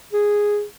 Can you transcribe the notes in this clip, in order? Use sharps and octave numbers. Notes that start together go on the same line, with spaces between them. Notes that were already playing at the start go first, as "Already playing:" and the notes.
G#4